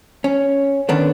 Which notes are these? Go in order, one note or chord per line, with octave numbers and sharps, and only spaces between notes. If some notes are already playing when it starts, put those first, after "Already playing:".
C#4
D3 D#3 B3 C#4 D4